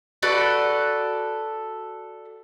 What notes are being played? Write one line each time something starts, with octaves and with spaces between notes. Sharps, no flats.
F#4 A4 B4 D5